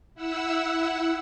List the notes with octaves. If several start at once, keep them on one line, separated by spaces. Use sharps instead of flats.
E4 F#5 E6